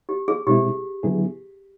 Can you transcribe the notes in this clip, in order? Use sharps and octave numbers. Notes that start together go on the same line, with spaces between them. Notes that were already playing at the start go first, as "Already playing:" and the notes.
G4
G#4
B2 G#3 C4 E4 G4
D3 F#3 B3 E4 G#4